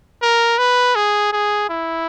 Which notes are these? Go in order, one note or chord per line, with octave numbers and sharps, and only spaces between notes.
A#4
B4
G#4
G#4
E4